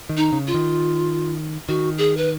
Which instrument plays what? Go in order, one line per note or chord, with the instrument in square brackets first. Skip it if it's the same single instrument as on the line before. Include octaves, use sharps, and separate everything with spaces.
[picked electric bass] D#3
[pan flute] D#4
[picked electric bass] C#3
[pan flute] F4
[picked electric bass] D#3
[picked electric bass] D#3 [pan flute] F#4
[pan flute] G#4
B4